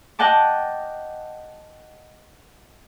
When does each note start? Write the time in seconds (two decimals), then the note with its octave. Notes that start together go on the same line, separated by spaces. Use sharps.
0.19 D#5 F#5 G5 A5 D6